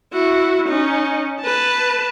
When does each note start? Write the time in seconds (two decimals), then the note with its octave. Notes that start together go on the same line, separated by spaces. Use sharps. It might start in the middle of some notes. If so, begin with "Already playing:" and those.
0.13 E4 F#4
0.69 C#4 D#4
1.41 B4 A5